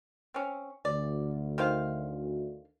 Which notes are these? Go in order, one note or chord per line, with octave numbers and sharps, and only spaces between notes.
C4 C#4
D2 D5
D#3 C5 F5